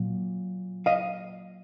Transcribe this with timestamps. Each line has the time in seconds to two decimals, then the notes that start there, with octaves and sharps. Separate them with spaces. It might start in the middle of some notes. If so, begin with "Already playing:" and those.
Already playing: A#2 F#3
0.86 D#5 F5